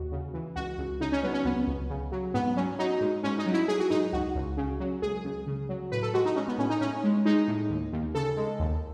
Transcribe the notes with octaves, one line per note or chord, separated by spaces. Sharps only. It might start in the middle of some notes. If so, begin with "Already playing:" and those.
Already playing: D#2 F#4
C#3
E3
C#2 F#4
C#2
C#3 D#4
C#4
F#3 B3
C#4
C#2 B3
C#2
C#3
F#3
G#2 B3
F#3 C#4
F#3 D#4
G#2
G#2 C#4
D#4
F#3
E4
F#3 G#4
F#4
G#2 D#4
C#2 F#4
C#2
C#3
F#3
C#2 G#4
C#2
C#3
F#3
A2 B4
A4
G#3 F#4
D#4
G#3 C#4
B3
A2 C#4
D#4
A2 C#4
G#3
G#3 D#4
A2
D#2
D#2
C#3 A4
G#3
D#2